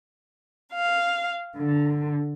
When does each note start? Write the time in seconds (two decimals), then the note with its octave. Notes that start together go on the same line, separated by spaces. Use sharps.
0.73 F5
1.55 D3